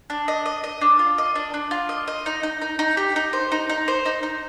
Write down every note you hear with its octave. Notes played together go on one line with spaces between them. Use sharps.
D4
D#5
D#5
D#5
D4
F4
D#5
D4
D4
F4
D#5
D#5
D#4
D#4
D#4
D#4
G4
D#4
C5
D#4
D#4
C5
D#4
D#4